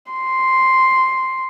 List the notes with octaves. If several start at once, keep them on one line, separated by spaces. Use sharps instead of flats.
C6